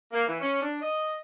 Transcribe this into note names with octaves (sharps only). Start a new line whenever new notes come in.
A#3
E3
C#4
D4
D#5